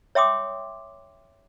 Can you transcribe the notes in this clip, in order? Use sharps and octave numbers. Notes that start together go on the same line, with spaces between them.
C#5 E5 G5 C6 D6 D#6